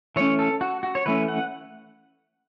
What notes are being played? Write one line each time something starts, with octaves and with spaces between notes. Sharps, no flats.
E3 A3 C#4 C#5
A4
F#4
F#4
C#5
E3 A3 C#4 B4
F#5